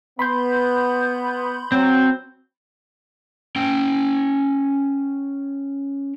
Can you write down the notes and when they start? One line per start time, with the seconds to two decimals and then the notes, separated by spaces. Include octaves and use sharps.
0.19 B3 B5 C6 G6
1.72 F#3 C4
3.56 C#4 G5